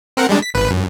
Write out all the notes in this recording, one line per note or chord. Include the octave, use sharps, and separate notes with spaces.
C4 A#4 F#5
G3 G#3 D4
B6
G#1 B4
F#2